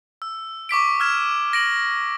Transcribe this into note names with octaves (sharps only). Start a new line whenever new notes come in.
E6
C#6 D6 B6 D7
E6 F6 G#6 E7
A#6 D7 F#7